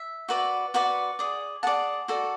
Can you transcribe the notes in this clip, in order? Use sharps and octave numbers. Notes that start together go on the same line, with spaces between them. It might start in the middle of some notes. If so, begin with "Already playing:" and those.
Already playing: E5
F#4 B4 D5
F#4 B4 D5 F#5
G#4 D5
G#4 D5 F#5 A5
F#4 A4 D5